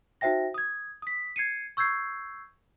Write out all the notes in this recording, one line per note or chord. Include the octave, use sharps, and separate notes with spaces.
D#4 F#4 C5 E5 G5 A#6
D#6 G#6
D#6 B6
G#6 C7 C#7 D#7
C#6 E6 G6 G#6 C7